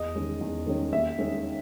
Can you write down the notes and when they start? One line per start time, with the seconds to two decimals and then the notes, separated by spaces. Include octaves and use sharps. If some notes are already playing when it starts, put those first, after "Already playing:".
Already playing: E2 D#5
0.15 D#3 G#3 C#4
0.41 E2
0.66 D#3 G#3 C#4
0.92 D#2 E5
1.18 D#3 G#3 C#4